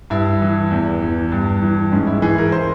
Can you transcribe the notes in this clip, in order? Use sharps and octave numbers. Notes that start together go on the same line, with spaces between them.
G2 E4
E3
E2
E3
G2
E3
G#2 C#4
E4
E3 G#4
A#4
C5